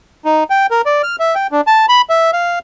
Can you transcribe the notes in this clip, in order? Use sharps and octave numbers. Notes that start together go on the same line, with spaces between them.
D#4
G5
A#4
D5
F6
E5
G5
D4
A5
B5
E5
F5